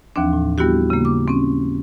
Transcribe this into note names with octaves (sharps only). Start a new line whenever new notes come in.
D#2 E3 F3 C4 D4
A2
G3 B3 E4 F#4 G4
C#3 A#3
D6
C4 C#4